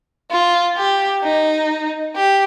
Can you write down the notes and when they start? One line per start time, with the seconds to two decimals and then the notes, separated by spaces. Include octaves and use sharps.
0.31 F4
0.77 G4
1.24 D#4
2.16 G4